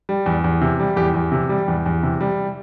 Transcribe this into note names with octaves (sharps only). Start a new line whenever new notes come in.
G3
E2
E2
C3
G3
E2 G4
E2
C3
G3
E2
E2
C3
G3